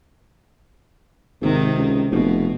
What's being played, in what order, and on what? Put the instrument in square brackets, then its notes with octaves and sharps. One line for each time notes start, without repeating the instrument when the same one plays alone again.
[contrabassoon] G#1 [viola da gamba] C3 D#3
[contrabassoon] C#2
[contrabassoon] F1 [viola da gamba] B2